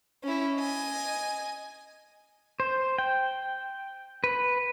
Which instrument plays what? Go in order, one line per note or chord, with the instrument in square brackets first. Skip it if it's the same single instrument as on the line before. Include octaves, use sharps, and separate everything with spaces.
[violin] C#4 E4
D#5 G#5
[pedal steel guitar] C5
G5
B4